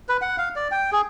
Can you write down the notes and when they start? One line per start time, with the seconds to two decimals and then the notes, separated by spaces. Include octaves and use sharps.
0.09 B4
0.22 F#5
0.38 F5
0.56 D5
0.71 G5
0.92 G#4